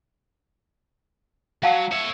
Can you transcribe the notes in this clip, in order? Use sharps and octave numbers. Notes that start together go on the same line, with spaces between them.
F#3 F5 F#5 A5
C#5 E5